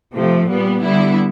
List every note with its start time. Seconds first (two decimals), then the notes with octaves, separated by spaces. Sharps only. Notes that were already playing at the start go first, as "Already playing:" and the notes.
0.14 C3 F3 A3
0.48 A#2 G3 B3
0.82 D3 G3 B3 E4